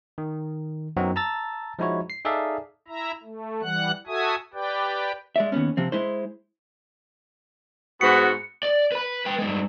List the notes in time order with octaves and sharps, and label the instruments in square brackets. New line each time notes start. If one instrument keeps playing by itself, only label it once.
[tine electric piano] D#3
F#2 F#3 B3 C4 D#4 F#4
A5 A#5 E6 A6
F3 G#3 D#4 E4 F#4 C#5
C7
D#4 G#4 A4 D5 E5 F5
[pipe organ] E4 E5 A#5
A3
E3 G3 F#5 F#6
F#4 A4 E5 G#5 D#6
G4 B4 D5 G5
[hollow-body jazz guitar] G#3 D5 E5
D#2 A#2 B3 C#4
C3 F3 C4
G#3 E4 C5
[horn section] G#2 B3 F#4 [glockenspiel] C#7
[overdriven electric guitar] D5
B4 B5
B4 G5
G2 G#3